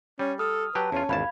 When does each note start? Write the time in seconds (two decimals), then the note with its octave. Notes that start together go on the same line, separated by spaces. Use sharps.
0.19 G3 C#4
0.39 A4 D#6 F6
0.75 F#3 G4 B4 A5
0.92 E2 C#4 F4
1.09 G#1 E2 F5 A5 B5 G#6